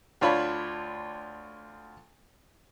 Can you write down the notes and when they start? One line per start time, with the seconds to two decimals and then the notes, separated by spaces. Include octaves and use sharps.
0.21 D2 D4 F4 C#5 F5 B5